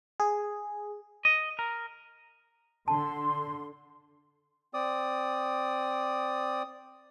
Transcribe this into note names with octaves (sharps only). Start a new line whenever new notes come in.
G#4
D#5
A#4
D3 A5 C6
C4 D5 D#6